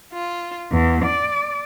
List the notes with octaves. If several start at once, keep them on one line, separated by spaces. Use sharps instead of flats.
F4
E2
D5